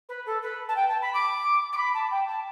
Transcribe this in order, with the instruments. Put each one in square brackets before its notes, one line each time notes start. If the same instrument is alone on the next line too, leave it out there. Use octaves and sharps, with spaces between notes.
[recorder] B4
A4
B4
A5
G5
A5
B5
D6
D6
B5
A5
G5
A5